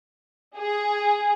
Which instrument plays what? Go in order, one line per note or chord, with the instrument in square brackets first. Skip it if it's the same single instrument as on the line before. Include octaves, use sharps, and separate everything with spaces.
[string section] G#4